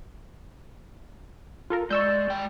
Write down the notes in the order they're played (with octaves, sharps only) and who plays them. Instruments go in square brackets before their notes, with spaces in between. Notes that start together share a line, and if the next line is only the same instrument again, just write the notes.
[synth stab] F4 A4 A#4
[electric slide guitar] G#3 [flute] D5 [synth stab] C#6 E6 G6
[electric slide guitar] G#3 G5